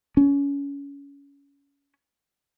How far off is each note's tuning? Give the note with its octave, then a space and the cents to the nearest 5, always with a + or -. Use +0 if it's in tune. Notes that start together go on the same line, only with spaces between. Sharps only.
C#4 +25